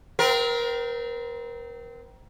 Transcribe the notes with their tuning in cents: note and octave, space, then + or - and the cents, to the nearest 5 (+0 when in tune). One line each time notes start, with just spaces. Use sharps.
C4 -25 A#4 +25